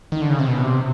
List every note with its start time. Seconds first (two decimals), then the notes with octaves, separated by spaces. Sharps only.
0.12 D#3
0.21 D3
0.30 C#3
0.39 C3
0.48 B2
0.64 C3